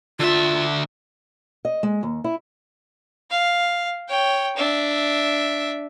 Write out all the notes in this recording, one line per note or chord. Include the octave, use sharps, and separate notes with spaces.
D3 F4 E5
D#5
G#3
D#2
E4
F5
C#5 G5
D4 E5